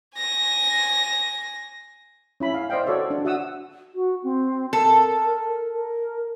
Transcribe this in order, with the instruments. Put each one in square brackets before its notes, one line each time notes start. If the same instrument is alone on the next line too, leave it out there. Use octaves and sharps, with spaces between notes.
[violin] G#5 A#6
[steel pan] C#4 E4 B5
F5
C5 D5 D#5 F5 G5
F#4 A4 C#5 D5 E5
D4
F#4 E5 F#5 D#6 E6
[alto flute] F#4
C4
[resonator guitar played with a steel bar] A4 [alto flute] A#4
[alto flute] A#4